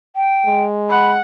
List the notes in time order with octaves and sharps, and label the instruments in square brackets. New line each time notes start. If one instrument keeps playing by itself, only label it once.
[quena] G5
[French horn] G#3
[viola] F#5 [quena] B5